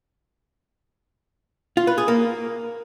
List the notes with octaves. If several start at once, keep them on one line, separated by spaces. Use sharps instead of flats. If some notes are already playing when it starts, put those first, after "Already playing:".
F4
B4
G#4
A#3